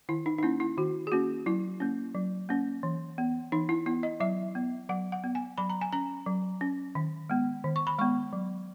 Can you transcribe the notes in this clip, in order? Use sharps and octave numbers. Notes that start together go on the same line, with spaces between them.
D#3 E4
D#4
D#4
A#3 C#4 E4
E4
D#3 F#4
G#4
A#3 C#4 F#4
F#3 E4
A#3 C#4
F#3
A#3 C#4
E3
B3
E3 D#4
E4
B3 E4
D#5
F#3 E5
B3
F#3 F#5
F#5
B3
G#5
F#3 B5
A#5
G#5
C#4 A#5
F#3
C#4
D#3
G#3 B3
D#3
C#6
B5
G#3 B3 C#6
F#3